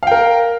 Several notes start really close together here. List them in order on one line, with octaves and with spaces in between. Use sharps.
F5 G5 A#4